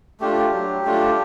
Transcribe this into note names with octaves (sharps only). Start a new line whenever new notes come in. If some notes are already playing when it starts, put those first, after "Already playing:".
A3 D4 F4 G4
F#3
A3 D4 F4